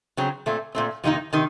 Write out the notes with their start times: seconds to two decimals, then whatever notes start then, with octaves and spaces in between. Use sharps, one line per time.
0.17 C#3 F#3 C4
0.46 A#2 A3 C4
0.75 A#2 A3 C4
1.04 F2 C3 D#3 A#3 D#4
1.33 C3 D#3